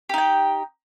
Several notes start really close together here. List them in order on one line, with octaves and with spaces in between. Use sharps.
G4 D#4 G5